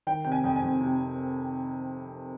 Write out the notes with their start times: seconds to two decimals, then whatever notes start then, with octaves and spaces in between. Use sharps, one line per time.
0.07 D#3 G5
0.25 C3 G5
0.32 G#5
0.44 F2 G5
0.56 G#5
0.63 F2
0.81 C3